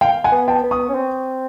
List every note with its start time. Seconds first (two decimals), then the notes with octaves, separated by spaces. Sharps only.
0.01 F5 G5
0.24 F#5 G#5
0.32 B3
0.48 G5 A5
0.63 B3
0.71 C#6 D#6
0.89 C#4
0.95 C4